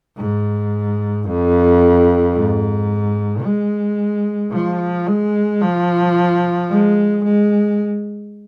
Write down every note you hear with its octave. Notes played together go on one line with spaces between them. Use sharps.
G#2
F2
G#2
G#3
F3
G#3
F3
G#3
G#3